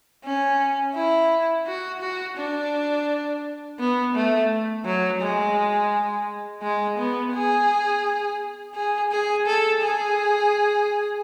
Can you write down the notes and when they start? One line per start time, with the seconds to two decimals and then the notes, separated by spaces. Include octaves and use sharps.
0.24 C#4
0.95 E4
1.67 F#4
2.01 F#4
2.37 D4
3.79 B3
4.15 A3
4.85 F#3
5.21 G#3
6.62 G#3
6.98 B3
7.33 G#4
8.74 G#4
9.11 G#4
9.47 A4
9.81 G#4